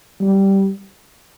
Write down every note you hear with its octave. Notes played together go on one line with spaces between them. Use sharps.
G3